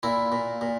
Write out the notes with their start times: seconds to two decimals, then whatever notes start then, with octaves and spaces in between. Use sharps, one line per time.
0.03 A#2 E4
0.32 A#2
0.61 A#2